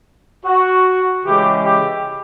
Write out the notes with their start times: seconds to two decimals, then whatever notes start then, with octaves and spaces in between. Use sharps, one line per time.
0.45 F#4
1.24 C#3 E3 G#3 G4
1.64 G4